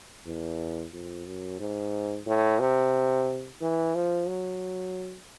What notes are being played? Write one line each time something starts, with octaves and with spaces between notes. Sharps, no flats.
E2
F2
F#2
G#2
A2
C3
E3
F3
F#3